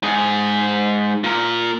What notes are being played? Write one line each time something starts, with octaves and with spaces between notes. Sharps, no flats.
G#2 G#4
A#2 A#4